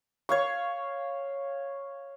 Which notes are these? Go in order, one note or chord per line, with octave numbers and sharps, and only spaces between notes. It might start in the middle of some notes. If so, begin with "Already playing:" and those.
C#5 F5 C#6